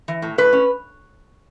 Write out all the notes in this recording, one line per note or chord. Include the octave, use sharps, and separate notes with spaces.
E3
A2
A2 B4
C#4